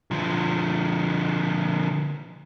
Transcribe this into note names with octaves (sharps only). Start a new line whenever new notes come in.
D3 F3